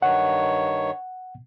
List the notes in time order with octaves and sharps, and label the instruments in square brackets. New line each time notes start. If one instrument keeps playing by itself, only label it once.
[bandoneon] G2 D#3 C#5 [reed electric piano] F#5